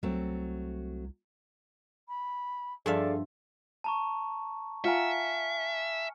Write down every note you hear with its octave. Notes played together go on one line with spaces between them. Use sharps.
C2 F#3 A3 C4
B5
G2 F3 G#4 A4 D5 E5 F5
A5 A#5 C#6
F4 E5 F#5 G#5 A#5 F6 C#7